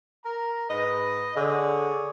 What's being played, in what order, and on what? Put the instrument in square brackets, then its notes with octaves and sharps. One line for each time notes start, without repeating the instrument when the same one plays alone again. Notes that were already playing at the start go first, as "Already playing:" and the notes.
[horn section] A#4 A#5
[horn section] G#2 B4 [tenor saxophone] D#5
[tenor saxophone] D3 [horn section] G#4 C#5 D5